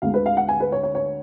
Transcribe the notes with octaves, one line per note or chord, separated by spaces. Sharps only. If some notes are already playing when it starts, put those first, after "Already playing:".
D2 D3 G#3 F5
B4
F5
F#5
G#5
B4
C#5
C#5
C#5